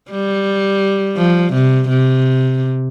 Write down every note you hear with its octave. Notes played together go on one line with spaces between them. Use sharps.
G3
F3
C3
C3